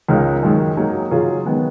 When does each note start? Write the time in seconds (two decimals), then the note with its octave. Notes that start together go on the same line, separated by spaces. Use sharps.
0.08 C#2 C#3 G#3 D#4 A#4
0.43 F#2 D#3 G#3
0.77 F#3 A#3 D#4 G#4
1.11 C#3 F#3 C#4 F4 G#4
1.46 D#3 G#3 B3